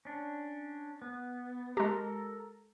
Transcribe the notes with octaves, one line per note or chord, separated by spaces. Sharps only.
C#4 D4
B3
G#3 G4 A4 A#4 A#5